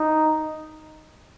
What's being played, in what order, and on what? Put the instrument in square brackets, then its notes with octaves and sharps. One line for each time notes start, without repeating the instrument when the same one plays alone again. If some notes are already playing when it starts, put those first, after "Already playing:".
Already playing: [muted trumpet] D#4